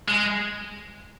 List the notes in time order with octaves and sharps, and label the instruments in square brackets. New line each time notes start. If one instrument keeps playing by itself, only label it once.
[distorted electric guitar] G#3